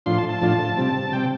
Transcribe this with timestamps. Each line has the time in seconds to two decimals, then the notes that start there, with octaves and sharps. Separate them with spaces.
0.06 A2 F3 D4 F4 C6
0.18 A5
0.29 A5
0.41 A2 F3 D4 F4
0.77 C3 G3 C4
1.12 C3 G3 C4 G5